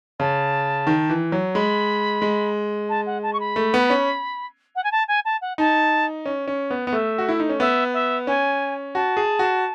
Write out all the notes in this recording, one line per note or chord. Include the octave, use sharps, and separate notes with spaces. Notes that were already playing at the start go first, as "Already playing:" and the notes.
C#3 A5
D#3
E3
F#3
G#3 B5
G#3
A5
F#5
A5
C#6
B5
A3
B3
C#4
F#5
G#5
A5
G#5
A5
F#5
D#4 A5
C#4
C#4
B3
B3
A3 E5
F#4
E4
D#4
C#4
B3 E5
E5
C#4 G#5
F#4 A5
G#4
F#4